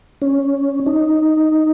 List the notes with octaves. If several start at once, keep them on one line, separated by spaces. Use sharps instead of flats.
C#4
D#4